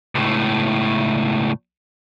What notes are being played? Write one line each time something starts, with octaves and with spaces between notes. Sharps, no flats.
C#2 A2